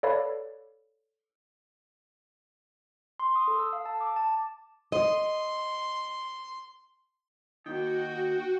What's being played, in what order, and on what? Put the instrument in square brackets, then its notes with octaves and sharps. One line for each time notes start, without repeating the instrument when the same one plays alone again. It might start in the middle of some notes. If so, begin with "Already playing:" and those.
[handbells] A4 B4 C#5 D5 F5 B5
C6
D#6
A4
E6
F5
A5
D6
A5
[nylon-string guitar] D#5 [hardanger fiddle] C6
[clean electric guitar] D#2 D#3 [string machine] F#4 [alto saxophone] G5